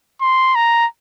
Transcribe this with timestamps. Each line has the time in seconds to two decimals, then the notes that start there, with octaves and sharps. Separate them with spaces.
0.21 C6
0.55 A#5